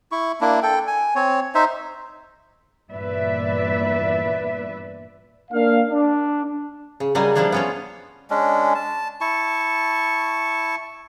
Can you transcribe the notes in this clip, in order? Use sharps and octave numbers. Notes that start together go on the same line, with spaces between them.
E4 C#6
A#3 D4 E4
A4 G5
G#5
C4 C#5
D#4 C5 E5
E2 G2 A#2 B4 D5 E5
A#3 D4 F5
D4
C#3
C#3 F#3 G3 A#3 D#5 G#5
F3 G3 A#3 D4 E4 F4
B3 C#4 F4
G#3 C#4 D4
A5
E4 A5 C#6